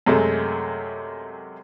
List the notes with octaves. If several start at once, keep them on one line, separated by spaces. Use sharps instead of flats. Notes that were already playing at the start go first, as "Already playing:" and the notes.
F#2 C3 G#3 A3